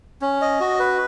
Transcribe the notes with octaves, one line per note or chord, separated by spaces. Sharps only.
C#4
D#5
F#4
B4